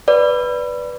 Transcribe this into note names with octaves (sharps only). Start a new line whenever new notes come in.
B4 D5